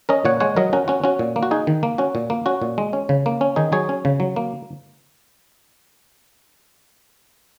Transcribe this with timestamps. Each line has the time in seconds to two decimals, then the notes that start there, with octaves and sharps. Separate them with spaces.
0.09 C#4 A#4 D#5
0.25 A#2 C#5 F#5
0.40 G#3 C#5 F#5
0.56 F#3 A#4 D#5
0.73 C#4 F#4 A#4
0.88 C#4 F#4
1.04 C#4 F#4
1.19 A#2
1.36 A#3
1.43 F#4
1.51 D#4 G#4
1.67 D#3
1.83 A#3
1.98 C#4 F#4
2.15 A#2
2.30 A#3
2.46 C#4 F#4
2.62 A#2
2.78 G#3
2.93 C#4
3.09 C#3
3.26 A#3
3.41 C#4
3.56 D#3 D#4 G#4
3.72 F#3 G#4 C#5
3.89 C#4
4.05 C#3
4.20 F#3
4.36 A#3